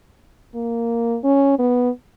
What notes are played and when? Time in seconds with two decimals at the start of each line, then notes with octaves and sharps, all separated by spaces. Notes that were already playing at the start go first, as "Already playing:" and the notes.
0.55 A#3
1.24 C#4
1.59 B3